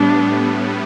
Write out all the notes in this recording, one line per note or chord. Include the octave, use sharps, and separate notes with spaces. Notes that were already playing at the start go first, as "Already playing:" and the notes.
Already playing: A2 G3 B3 D4